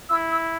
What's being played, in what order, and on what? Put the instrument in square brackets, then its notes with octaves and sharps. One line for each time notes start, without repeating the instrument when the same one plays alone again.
[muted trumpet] E4 [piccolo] E6
[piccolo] E6